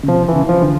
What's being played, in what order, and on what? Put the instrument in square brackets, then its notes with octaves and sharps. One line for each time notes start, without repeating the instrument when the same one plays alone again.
[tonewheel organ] C#3
[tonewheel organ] C3 [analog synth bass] F3
[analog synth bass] E3
[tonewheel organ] C#3
[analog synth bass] F3
[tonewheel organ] D3